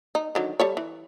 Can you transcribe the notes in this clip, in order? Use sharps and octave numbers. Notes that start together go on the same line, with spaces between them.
D#4
D3 D#3 F#3
G3 A4 C#5
E3